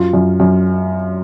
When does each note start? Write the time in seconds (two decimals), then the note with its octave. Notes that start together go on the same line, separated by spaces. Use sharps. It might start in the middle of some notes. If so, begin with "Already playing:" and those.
Already playing: F#2 F4
0.13 F#2
0.40 F#2